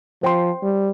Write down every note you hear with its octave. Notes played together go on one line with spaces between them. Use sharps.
F3 C5 G5 C6
G3